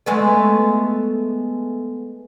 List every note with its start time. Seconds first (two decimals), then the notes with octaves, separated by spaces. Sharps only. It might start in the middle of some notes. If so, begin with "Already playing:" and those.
0.06 G#3 A3 B3